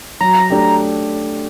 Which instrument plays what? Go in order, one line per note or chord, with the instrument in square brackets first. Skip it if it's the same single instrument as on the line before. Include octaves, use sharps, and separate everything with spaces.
[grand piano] F#3 [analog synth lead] A#5
[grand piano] A3 D4 G4